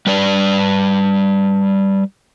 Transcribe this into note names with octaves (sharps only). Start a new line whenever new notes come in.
G3 B4 D5